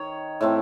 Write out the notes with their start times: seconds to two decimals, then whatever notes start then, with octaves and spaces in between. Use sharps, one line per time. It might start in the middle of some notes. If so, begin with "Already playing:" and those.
Already playing: D#3 C#5
0.41 A2 E3 A3 C4